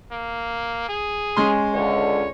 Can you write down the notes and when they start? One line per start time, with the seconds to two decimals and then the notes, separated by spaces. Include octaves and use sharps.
0.12 A#3
0.89 G#4
1.37 G#3 C#4 C6
1.74 C#2 D3 C#5